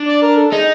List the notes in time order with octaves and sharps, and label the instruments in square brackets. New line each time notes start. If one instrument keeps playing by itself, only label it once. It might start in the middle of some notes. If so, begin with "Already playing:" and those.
Already playing: [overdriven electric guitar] D4
[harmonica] D5
A#4
A4
[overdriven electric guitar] D#4 [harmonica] G#4